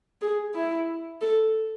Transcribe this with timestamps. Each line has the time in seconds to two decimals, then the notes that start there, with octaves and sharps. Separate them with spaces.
0.21 G#4
0.55 E4
1.21 A4